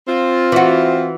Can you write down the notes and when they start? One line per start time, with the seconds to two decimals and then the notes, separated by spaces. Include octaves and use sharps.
0.08 C4 F4
0.52 E3 F#4